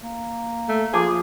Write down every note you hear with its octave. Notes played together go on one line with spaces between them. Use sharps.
A#3
A3
F3 G#4 D6